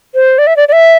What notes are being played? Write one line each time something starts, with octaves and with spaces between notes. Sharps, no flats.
C5
D5
E5
D5
D5
E5